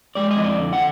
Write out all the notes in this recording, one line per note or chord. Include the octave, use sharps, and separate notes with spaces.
G#3 D5
D#5
F2
D5
D3
F#5